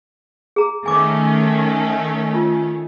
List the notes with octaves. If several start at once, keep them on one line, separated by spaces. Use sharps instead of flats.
G#4 A#5
D#3 A3 C#4 G#5 D6
F4